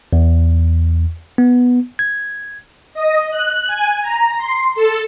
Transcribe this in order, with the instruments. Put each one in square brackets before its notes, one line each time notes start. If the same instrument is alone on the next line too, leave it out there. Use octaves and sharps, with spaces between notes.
[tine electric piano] E2
B3
G#6
[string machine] D#5
F#6
G#5
A#5
C6
A4